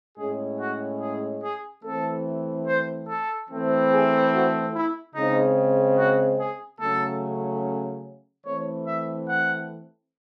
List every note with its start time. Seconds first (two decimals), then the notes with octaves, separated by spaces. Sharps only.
0.18 A2 G#3 C#4 G#4
0.60 F#4
1.01 G#4
1.43 G#4
1.84 E3 A3 C4 A4
2.67 C5
3.08 A4
3.49 E3 A3 C4
3.91 G#4
4.32 F#4
4.73 E4
5.15 C#3 G#3 C4 D#4
5.97 F#4
6.39 G#4
6.80 C#3 F#3 A3 C#4 A4
8.46 E3 A3 C4 C#5
8.87 E5
9.28 F#5